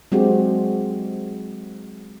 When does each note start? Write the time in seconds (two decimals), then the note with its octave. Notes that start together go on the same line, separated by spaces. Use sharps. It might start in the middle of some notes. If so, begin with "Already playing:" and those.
0.12 F#3 G#3 C4 D4 F#4 G4